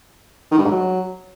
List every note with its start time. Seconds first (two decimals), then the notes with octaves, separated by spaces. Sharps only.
0.51 D#3
0.58 G2
0.64 G#2
0.71 F#3